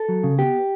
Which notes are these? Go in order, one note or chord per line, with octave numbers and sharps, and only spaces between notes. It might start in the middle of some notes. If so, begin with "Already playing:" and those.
Already playing: A4
F#3
C#3
B3 G4